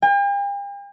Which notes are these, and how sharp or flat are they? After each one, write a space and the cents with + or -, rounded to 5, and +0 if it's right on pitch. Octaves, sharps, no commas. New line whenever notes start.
G5 +45